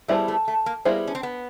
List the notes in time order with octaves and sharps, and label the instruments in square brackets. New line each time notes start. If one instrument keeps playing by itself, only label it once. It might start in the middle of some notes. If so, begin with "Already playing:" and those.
[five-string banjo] G3 B3 E4 G#4 C5 [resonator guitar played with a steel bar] A3
[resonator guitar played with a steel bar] A3
A3
A#3
[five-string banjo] G3 B3 E4 G#4 C5 [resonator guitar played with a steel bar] A#3
[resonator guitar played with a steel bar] C#4
C4
B3